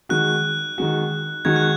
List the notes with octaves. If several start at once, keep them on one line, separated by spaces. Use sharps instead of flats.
D#3 G#3 F#4 F#6
D#3 G#3 F#4
D#3 G#3 F#4 G#6
F#6